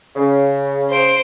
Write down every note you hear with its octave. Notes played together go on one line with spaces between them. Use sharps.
C#3
C5 D7